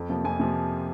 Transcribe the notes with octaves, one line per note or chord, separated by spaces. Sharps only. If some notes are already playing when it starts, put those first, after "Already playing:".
Already playing: F2
C3 F3 A#3
F2 G#5
C3 F3 A#3